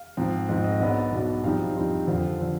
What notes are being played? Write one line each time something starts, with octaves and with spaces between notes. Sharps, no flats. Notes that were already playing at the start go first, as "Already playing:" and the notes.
Already playing: F5
G#2 F3 C4
G#2 F3 C4 D#5
D#5
B1 B2 B3 D4
B1 B2 B3 D4
G2 F3 C4 D#4 F5
G2 F3 C4 D#4
F2 D3 F3 F5
D3 F3